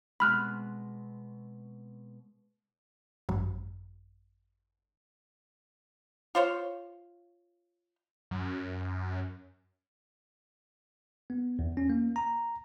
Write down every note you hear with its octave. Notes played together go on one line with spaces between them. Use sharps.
B2 G#3 C4 B5 F6 F#6
G#1 F#2
F4 C5 C#5
F#2
B3
E2
C#4
A#3
A#5